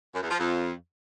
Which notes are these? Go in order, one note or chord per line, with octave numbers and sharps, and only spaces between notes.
F#2
E2
F3
F2